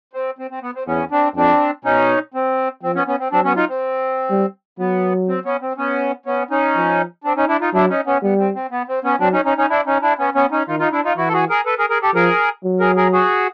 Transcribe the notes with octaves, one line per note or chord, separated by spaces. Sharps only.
C4
C4
C4
B3
C4
E2 B3 C#4
C4 D4
F2 C4 D4
B2 C#4 D#4
C4
F3 C4
B3 C#4
B3 C#4
C4
F#3 C4 D4
B3 C#4
D#4 F4
C4
G3
F#3 B3
C4
B3 C#4
C4
B3 C#4
B3 C#4
C#4 D#4
F3
C4 D4
C#4 D#4
D4 E4
D#4 F4
F#3 D4 E4
C#4 D#4
B3 C#4
G3 B3
C4
C4
B3
C4
B3 C#4
F#3 C4 D4
C#4 D#4
C#4 D#4
C#4 D#4
D4 E4
C#4 D#4
D4 E4
B3 C#4
B3 C#4
C#4 D#4
D#3 D#4 F4
D#4 F4
D4 E4
D#4 F4
E3 E4 F#4
A4
F#4 G#4
G#4 A#4
A4 B4
G#4 A#4
G#4 A#4
G4 A4
F3 G#4 A#4
F#3
G#4 A#4
G#4 A#4
F#4 G#4